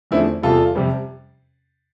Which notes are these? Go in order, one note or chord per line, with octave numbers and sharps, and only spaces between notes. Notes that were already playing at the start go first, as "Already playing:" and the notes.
E2 D3 F3 A3 C4 E4
E2 C3 G3 F4 A4
F2 C3 G3 C4